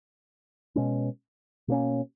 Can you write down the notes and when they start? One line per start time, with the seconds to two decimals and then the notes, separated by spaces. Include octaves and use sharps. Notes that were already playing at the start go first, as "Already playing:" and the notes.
0.75 B2 G#3 C#4
1.68 B2 A#3 C#4